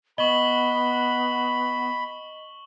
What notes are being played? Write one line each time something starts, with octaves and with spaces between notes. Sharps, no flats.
B3 D#5 B5 C#6 F#7 G7